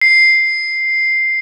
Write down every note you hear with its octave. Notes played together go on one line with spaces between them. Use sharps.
C7